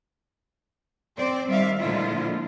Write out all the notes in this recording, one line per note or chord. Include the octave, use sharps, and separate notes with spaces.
C4 C5 D5
D#3 G3 E5 F5
A#2 D3 F3 G#3 E4 F4